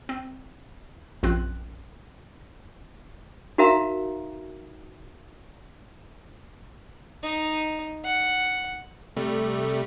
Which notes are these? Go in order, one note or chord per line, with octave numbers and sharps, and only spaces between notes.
C4
A#1 F#2 C4 F4 F#6
D#4 F#4 A#4 E5 F5 A#5
D#4
F#5
C3 G3 A3